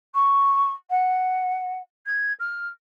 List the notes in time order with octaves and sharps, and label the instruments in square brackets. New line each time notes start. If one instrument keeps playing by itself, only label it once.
[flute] C#6
F#5
G#6
F6